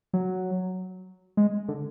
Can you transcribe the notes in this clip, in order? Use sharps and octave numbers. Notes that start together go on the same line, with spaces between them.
F#3
G#3
D3